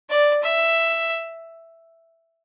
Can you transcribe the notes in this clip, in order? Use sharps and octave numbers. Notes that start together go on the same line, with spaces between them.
D5
E5